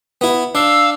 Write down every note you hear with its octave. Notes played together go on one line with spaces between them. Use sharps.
B3 E4
D4 F5 E6